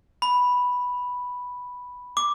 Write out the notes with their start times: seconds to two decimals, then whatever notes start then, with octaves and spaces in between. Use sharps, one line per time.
0.22 B5
2.17 D6